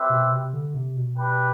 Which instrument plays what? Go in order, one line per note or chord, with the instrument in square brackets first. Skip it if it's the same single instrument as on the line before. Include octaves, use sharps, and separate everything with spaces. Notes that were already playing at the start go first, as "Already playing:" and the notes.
Already playing: [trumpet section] G3 C4 G4 B4 E5
[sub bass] B2
C3
D3
C3
B2
[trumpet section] D4 G4 B4